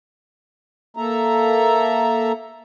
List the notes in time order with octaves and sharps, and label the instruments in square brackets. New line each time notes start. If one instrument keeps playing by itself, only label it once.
[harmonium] A#3 A4 E5 A#5